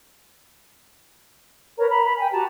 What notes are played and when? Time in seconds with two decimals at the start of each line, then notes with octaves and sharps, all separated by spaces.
1.78 A#4 B4 C#5 A#5
1.90 A#5 B5
2.05 B5
2.18 G5 G#5
2.32 F#4 G4 A5 A#5